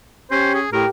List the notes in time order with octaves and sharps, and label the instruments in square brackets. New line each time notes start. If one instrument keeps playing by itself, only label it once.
[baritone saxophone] C#4 [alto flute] G4 [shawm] C5
[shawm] G#4
[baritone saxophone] A2 [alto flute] G4 [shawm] A#4